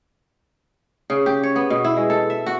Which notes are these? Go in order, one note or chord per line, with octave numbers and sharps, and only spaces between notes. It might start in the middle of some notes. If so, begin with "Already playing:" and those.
C#3
G4
C#5
B3
B2
E4
G#3
A4
E5
F#4